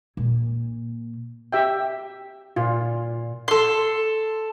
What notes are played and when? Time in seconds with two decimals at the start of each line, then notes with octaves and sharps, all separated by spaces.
0.17 A#2
1.53 G4 E5 G5
2.56 A#2 F4
3.48 A4 C6